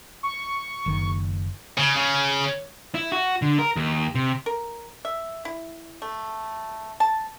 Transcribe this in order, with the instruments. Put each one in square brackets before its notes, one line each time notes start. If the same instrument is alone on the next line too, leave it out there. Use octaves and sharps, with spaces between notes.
[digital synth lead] C#6
[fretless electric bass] F#1 D#3
[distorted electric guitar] C#3
C#3
[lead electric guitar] E4
F#4
D3
A#4
D#2
C3
[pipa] A#4
E5
E4
A3
A5